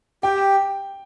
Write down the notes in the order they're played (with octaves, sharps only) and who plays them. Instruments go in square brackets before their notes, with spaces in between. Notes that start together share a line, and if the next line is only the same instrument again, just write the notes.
[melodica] G4 [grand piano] G5